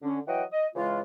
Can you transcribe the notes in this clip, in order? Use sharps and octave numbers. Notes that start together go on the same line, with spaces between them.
D3 C#4
E3 F#3 D#5 F#5 G5
D#5
C#3 E3 G#3 F4